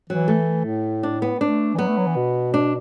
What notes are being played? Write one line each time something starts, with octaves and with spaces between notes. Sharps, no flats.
E3 F#3
A3
A2
D4
B3
A3 D4
E3
F#3 B3
A3
F#3
E3
B2
D4